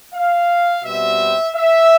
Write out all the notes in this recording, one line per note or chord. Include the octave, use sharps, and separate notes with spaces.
F5
B2 G3 C4 E5
E5